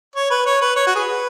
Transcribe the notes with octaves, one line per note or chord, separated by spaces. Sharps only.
C#5
B4
C#5
B4
C#5
F#4
G#4 B4